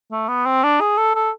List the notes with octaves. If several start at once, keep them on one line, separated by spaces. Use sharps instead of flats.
A3
B3
C4
D4
G#4
A4
A4